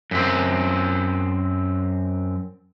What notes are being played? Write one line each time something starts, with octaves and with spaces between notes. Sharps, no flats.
F#2 C4